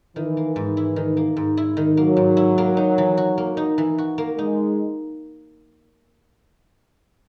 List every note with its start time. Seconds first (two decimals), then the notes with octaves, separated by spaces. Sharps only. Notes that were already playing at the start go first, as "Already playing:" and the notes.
0.16 D#3 E3
0.37 A#3
0.56 G#2
0.77 E4
0.96 D#3
1.17 A#3
1.37 G#2
1.57 E4
1.77 D#3
1.97 F#3 A#3
2.17 G#2
2.37 E4
2.58 A#3
2.77 D#4
2.98 E3
3.17 F#4
3.38 A#3
3.57 D#4
3.78 E3
3.98 F#4
4.18 A#3
4.38 G#3 D#4